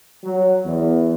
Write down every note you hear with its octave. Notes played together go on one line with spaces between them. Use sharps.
F#3
E2